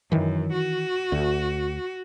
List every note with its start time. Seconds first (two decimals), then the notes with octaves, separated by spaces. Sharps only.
0.12 F#2 D#3 E3
0.53 F#4
1.12 D2